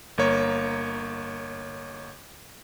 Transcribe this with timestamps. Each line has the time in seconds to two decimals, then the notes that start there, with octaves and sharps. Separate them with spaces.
0.18 G1 A#3 C#5